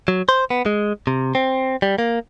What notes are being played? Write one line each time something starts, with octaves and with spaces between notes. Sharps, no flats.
F#3
C5
B3
G#3
C3
C4
G3
A#3